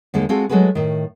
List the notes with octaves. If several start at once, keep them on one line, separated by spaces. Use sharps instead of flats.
D#2 D3 G#3 A#3
G#3 C4 F4 F#4 G#4 A4
F#3 G#3 A3 F#4 G#4 B4
A2 D#3